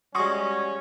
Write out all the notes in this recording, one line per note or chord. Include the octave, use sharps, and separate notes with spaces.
G3 G#3 C#4 F#4 C6 C#6 D#6